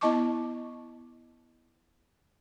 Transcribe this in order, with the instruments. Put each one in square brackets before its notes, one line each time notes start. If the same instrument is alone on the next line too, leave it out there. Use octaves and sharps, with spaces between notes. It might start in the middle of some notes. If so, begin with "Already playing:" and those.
[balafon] B3 E4 D#5 A5 C#6 D6